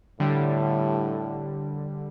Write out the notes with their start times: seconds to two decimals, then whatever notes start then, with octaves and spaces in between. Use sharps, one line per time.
0.20 A2 D3 G3